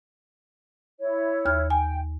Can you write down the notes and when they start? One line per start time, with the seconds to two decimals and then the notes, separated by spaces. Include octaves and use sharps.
1.00 E4 C#5
1.45 D#2 F6
1.70 G5 G#5